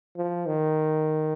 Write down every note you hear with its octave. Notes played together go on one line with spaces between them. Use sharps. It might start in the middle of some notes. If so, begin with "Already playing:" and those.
F3
D#3